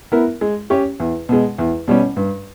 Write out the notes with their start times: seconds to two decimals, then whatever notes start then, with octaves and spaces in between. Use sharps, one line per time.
0.12 B3 E4 A#4
0.41 G#3
0.70 C#4 G4 C#5
1.00 E2
1.29 B2 G#3
1.58 E2
1.88 B2 G3 C#4
2.17 G2